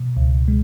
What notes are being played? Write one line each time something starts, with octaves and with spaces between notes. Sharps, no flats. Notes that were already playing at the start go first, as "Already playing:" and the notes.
Already playing: B2
C#2
G#3